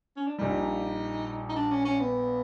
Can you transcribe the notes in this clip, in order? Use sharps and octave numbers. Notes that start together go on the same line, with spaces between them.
C#4
D4
A#1 A#2 G3 D#4
D#4
D4
C#4
C#4
B3